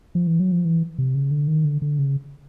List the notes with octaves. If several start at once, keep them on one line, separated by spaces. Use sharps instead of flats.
F3
E3
F#3
F3
E3
C3
C#3
D3
D#3
D3
D3
C#3